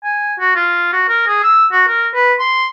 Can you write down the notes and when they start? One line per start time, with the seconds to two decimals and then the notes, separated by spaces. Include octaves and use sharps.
0.04 G#5
0.39 F#4
0.55 F4
0.93 F#4
1.08 A#4
1.27 G#4
1.44 E6
1.72 F#4
1.88 A#4
2.14 B4
2.39 C6